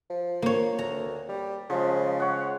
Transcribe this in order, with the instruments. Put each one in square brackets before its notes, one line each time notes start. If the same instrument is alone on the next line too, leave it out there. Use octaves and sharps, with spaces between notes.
[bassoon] F3
[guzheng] A#3 C#5
[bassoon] D2 [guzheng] A#5
[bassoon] G3
[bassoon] C#3 [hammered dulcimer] F3 G#3
[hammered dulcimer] C#5 F#5